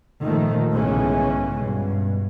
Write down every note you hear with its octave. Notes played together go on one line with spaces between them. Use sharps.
A#2 D#3 F3 A3
B1 G#2 C#3 E3 G#3 C#4
G2 B2